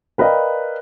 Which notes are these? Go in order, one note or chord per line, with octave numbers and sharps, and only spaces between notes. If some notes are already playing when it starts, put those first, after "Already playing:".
A#4 B4 D5 D#5 F5 G5